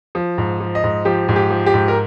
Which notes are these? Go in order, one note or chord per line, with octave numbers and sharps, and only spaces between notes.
F3
G#2
F3
D#5
G#2
F3 G4
G#2
G4
F3
G4
G#2
A#4